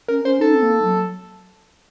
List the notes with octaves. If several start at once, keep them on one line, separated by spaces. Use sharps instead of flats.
C#4 A#4
C#4 C5
D#4 A4
C4
A#3
F#3